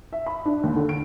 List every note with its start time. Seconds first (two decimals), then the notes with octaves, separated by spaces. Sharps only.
0.13 E5
0.26 B5
0.45 D4
0.63 D#2
0.76 D3
0.89 D7